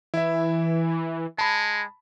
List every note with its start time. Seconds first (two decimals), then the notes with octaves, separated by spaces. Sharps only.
0.14 E3 E4 E5
1.38 G#3 A5 B5